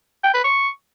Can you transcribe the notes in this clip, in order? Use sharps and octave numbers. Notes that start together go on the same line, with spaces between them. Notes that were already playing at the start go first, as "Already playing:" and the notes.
G5
B4
C#6